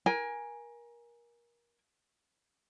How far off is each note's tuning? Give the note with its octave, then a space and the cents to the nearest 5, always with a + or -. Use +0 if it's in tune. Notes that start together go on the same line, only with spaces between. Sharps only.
A#4 +25 G#5 -5